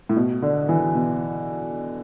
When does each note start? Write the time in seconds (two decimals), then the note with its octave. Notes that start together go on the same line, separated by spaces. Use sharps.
0.09 A2
0.16 B2
0.42 D3
0.69 E3
0.95 B2